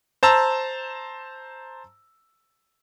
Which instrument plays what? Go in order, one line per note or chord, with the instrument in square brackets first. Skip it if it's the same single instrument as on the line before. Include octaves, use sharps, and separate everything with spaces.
[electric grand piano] C5 A5 A#5 E6